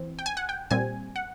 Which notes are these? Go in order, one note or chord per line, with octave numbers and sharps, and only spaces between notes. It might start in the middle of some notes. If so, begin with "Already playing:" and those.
Already playing: E3 C4
G5
G#5
F#5
G5
A#2 G3 C4 G#5
F#5